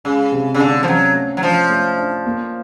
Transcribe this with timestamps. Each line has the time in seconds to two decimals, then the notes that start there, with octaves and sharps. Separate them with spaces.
0.05 C#3 G#3
0.32 C3
0.54 C#3
0.60 D3 G#3
0.83 F3
0.87 F#3 C#4
1.15 A3
1.37 F#3
1.42 F3 D4
1.70 A3
1.98 D4
2.26 A#3